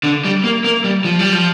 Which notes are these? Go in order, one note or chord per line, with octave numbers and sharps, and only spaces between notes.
D3
G3
A#3
A#3
G3
F3
G3
F3